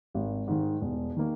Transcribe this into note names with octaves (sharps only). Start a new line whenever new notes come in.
G#1
G#2 D#3
E1
D#3 A#3